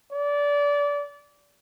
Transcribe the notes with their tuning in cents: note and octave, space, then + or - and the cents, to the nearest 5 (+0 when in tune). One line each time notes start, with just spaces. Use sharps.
D5 -25